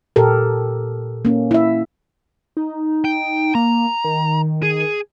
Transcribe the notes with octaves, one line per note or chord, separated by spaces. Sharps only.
A#2 G4 A4 A#4
A#3 C#4
E4 E5
D#4
G5
A#3 A#5
D#3
G#4